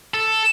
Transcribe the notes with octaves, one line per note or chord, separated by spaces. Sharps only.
A4